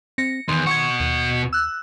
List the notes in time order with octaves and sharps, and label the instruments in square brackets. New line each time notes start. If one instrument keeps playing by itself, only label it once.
[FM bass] C4 [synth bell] A#6 C#7
[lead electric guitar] E2 [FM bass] D#3 [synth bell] C6
[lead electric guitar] B2 F#5 [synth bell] C#6 G#6
[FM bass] D#2
[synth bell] E6 F#6